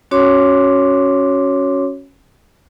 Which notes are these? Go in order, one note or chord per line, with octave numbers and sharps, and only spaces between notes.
C#4 F#4 C#5 C6 D6